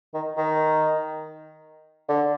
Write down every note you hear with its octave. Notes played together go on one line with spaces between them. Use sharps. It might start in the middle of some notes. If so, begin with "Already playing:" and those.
D#3
D#3
D3